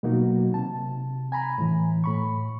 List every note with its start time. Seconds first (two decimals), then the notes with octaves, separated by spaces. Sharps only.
0.03 B2 F#3 A#3 D#4 F#4
0.54 C3 A5
1.32 G#5 A#5 B5
1.58 A2 E3
2.04 A2 B5 C#6